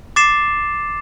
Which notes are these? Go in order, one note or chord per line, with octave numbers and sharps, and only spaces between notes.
D6 A6 C7 E7